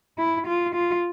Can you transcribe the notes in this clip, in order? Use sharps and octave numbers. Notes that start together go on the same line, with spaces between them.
E4
F4
F4